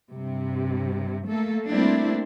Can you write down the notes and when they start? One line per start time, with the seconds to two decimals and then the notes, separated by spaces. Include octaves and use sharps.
0.12 G2 C3
1.26 A3 A#3 A4
1.69 G3 A3 A#3 C4 D4 E4